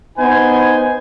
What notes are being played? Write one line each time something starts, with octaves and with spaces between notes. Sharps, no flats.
B3 D#4 C5 G#5